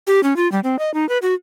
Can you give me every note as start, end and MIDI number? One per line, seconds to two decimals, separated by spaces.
0.07 0.21 67
0.23 0.36 61
0.36 0.50 65
0.52 0.60 55
0.64 0.79 60
0.79 0.93 75
0.94 1.08 63
1.09 1.18 71
1.22 1.34 66